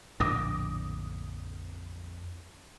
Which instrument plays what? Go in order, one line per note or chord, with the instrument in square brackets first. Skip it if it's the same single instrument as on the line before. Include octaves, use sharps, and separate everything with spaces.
[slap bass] A#1 A2 D3 [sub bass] F2 [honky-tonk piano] D6 D#6 A#6